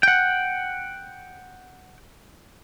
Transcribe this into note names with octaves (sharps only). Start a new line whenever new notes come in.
F#5 G5